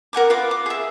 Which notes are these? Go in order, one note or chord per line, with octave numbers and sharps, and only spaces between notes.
A#4 F#5 G#5 D6
F4 B4 D6
D6
G#4 E5